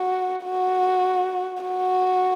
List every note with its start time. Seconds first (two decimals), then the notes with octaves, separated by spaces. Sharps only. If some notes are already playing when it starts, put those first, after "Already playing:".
Already playing: F#4
0.43 F#4
1.63 F#4